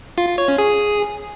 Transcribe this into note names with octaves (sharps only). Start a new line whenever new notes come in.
F4
F4
C#5
C#4
G#4